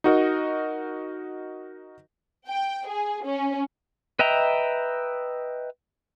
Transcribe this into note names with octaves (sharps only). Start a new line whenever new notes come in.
D#4 F#4 A#4 D#5
G5
G#4
C#4
B4 D#5 E5 G5 A#5